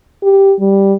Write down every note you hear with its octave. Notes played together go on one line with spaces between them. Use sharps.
G4
G3